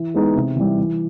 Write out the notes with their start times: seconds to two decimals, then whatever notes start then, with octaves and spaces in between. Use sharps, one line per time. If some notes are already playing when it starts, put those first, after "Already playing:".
Already playing: E3
0.14 G#3 B3 D#4 G#4
0.35 C3
0.56 E3 G3
0.78 E3